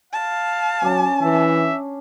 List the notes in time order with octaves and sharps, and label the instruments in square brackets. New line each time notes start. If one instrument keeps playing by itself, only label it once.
[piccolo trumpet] F5 [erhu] A5
[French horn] F#3 [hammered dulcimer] C#4 D4
[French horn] E3 [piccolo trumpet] E5